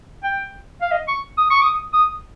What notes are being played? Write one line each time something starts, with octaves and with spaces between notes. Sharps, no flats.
G5
F5
D#5
C#6
D#6
C#6
D#6
D#6